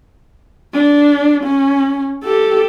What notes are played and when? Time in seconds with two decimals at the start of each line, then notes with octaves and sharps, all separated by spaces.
0.74 D4
1.44 C#4
2.24 G4 A4